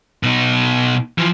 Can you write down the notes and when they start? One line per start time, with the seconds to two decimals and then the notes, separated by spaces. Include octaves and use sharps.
0.23 B2 D#4
1.18 E3 F3